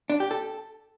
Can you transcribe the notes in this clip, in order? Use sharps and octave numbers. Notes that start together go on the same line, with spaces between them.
D4
G4
A4